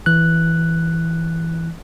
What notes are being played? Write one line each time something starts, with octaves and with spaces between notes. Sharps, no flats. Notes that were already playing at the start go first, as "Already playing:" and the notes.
E3 F#6